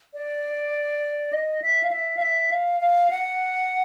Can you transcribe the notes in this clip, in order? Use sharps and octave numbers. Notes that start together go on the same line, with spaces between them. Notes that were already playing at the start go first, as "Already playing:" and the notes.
D5
D#5
E5
F5
E5
F5
E5
F5
F5
F#5